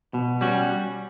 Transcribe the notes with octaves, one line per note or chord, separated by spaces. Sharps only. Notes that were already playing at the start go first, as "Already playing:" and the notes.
B2
G3 C#4 F#4